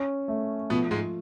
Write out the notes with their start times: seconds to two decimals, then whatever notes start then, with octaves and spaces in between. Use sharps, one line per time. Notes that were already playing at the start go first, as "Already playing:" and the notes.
Already playing: C#4
0.28 A3
0.70 B2 F3 B3
0.91 G#2 G#3